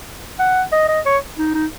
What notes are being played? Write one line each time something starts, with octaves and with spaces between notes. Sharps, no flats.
F#5
D#5
D#5
C#5
D#4
D#4